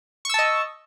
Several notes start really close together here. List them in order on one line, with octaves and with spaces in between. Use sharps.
C#6 E6 A5 D#5